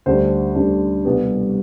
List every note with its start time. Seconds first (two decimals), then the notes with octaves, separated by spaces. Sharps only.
0.06 D2 D3 G3 D4 C5
0.55 D2 D3 G3 D4
1.05 C2 B2 G3 B3